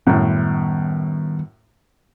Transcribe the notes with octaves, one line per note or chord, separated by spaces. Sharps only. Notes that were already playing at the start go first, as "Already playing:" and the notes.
F#2 A2 D#3 G3 B3